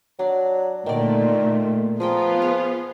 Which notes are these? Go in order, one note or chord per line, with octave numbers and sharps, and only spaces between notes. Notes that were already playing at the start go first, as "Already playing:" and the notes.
F#3 D4
A#2 D3 D#3 A3 D5
F3 B3 F4 G#4 A#4 G5
G#4